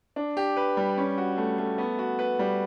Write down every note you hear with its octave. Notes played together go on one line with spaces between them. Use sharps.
D4
G4
B4
G3
C#4
F#4
A3
A3
B3
F#4
B4
G3